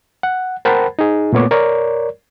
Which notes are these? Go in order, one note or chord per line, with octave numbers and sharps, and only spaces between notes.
F#5
A#4 C5 F#5 G5 A5 B5
D#4 G#4
A#2 A3 B3 C#5 D6
A#4 C#5 D5